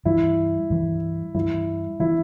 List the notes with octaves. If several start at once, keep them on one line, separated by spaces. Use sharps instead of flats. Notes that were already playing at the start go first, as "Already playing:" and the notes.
G2 E3 G3 E4
G2 E3 G3
G2 E3 G3 E4
E3 G3 E4